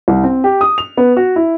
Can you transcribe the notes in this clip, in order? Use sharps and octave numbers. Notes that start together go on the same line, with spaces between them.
C2
C4
G4
D#6
F7
B3
F#4
E4